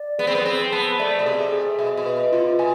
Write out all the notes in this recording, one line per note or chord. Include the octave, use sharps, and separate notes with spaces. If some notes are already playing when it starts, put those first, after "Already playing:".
Already playing: D5
B3 G#4
C4
B3
C4 G#4
B3 A5
A3 D5
B2
C3 G#4
G#4
B2 E5
B2
B4
C3 F4
B2 G#5